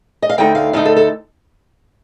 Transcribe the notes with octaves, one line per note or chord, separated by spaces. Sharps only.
D#5
F5
D2 D3 A3 D#4 G5
F5
D2 D3 A3 D#4 F5
A4
A4